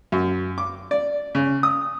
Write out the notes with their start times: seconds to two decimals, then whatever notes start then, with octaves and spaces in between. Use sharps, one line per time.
0.12 F#2
0.58 D6
0.91 D5
1.35 C#3
1.63 D#6